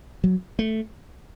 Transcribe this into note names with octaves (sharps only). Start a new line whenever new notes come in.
F#3
A3